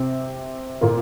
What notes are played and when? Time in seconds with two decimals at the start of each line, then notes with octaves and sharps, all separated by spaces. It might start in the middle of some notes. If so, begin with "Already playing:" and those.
Already playing: C3 C4
0.81 A#2 A#3